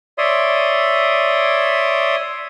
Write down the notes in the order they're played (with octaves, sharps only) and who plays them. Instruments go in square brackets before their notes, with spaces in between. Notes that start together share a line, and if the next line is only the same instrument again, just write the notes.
[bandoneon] C#5 D5 E5 C6 D#6